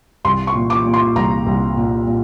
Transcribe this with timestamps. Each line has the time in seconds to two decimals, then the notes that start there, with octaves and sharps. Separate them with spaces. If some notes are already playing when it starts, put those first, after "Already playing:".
0.24 C2 C6
0.47 C#6
0.55 A#2
0.70 D6
0.85 A#2
0.94 C6
1.15 C2 A#5
1.46 C2
1.77 A#2
2.07 A#2